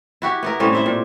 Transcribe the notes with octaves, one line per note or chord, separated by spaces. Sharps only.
E4 F#4 G4
B3 E4 A#4
A2 G3 C4 C#4
E4 C5 E5
A#2